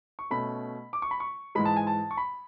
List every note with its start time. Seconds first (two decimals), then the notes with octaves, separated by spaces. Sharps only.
0.19 C#6
0.30 B2 A3 C#4 B5
0.93 D6
1.02 C#6
1.11 B5
1.20 C#6
1.55 G#2 E3 G#3 B5
1.65 A5
1.76 G#5
1.87 A5
2.11 C#6
2.17 B5